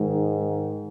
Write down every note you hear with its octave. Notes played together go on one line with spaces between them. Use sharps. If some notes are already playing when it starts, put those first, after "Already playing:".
Already playing: G#2 D#3 G#3